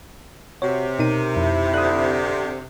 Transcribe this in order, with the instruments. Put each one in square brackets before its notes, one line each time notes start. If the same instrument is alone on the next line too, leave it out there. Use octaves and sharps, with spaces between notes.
[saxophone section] C3 [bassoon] F#4 [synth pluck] C#5
[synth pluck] B2 D#4 D#7 [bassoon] A#4
[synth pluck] F2 [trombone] E4
[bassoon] D3 [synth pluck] D#6 F#6